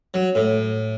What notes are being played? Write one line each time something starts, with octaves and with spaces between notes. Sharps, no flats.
F#3
A2